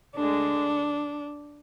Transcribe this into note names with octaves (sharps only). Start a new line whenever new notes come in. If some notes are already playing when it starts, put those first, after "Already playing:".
D2 D3 G#3 D4